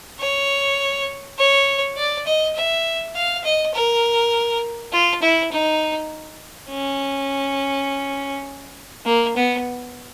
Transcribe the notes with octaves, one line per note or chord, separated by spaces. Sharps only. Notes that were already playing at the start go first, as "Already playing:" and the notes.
C#5
C#5
D5
D#5
E5
F5
D#5
A#4
F4
E4
D#4
C#4
A#3
B3